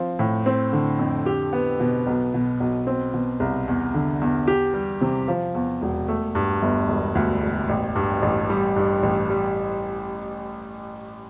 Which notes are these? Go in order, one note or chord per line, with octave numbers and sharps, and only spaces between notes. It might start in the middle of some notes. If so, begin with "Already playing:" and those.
Already playing: F3 C4
A2
C4
D3
F2
G4
B3
B2
B1
B2
B1
C4
B2
C2
E2
D3
E2
G4
G3
C3
F3
E2
E1
A3
G2
G1
E1
D2
E1
A1
G2
A1
G3
G2
A1
G3